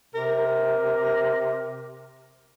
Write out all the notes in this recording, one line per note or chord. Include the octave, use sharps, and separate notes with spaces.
C3 A#4